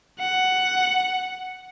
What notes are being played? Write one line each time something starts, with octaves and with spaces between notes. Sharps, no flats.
F#5